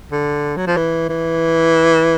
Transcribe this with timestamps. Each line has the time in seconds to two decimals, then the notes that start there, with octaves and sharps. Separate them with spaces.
0.12 D3
0.57 F#3
0.67 F3
0.77 E3
1.09 E3